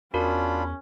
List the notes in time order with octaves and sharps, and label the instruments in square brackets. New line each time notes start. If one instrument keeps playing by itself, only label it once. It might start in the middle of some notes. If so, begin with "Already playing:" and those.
[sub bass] E2 [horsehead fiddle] C#4 [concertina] D4 F4 B5 [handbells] F#4 A#4